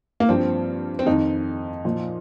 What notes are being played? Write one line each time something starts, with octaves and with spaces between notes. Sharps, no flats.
A#3
G2 F3 C4
C4
F2 D#3 D#4
A#2 F3